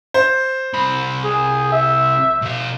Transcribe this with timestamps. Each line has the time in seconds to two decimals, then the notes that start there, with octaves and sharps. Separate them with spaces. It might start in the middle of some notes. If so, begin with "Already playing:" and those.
0.14 C5
0.74 C2 B5
1.24 G#4
1.72 E5
2.42 B2 F5